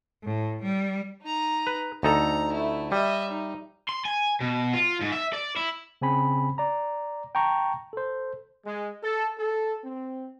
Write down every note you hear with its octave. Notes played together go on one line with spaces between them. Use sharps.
A2
G3
D#4 A#5
B4
D2 D#4 A4 A#5
A3 E4
G3 D#5 E5
D#4
C6
G#5
B2
F4
G#2
E5
D5
E4
C#3 C4 G#5 B5
D5 A#5
G5 A5 A#5 C#6
A4 C5
G#3
A4
A4
C4